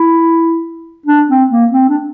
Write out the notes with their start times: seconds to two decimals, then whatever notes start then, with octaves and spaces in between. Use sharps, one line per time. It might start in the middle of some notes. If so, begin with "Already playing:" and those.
Already playing: E4
1.06 D4
1.28 C4
1.50 A#3
1.72 C4
1.89 D4